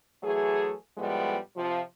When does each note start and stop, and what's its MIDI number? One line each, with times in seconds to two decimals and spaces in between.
0.23 0.73 52
0.23 0.73 54
0.23 0.73 57
0.23 0.73 68
0.97 1.36 45
0.97 1.36 53
0.97 1.36 55
0.97 1.36 56
0.97 1.36 59
1.56 1.80 48
1.56 1.80 53